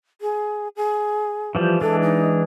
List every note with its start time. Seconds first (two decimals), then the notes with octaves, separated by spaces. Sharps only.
0.21 G#4
0.76 G#4
1.55 E3 F3 G3
1.81 E3 G#3 D4 A4
2.03 D#4